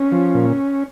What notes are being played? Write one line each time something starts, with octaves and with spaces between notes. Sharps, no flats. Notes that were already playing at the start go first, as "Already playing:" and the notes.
Already playing: C#4
F3
A#2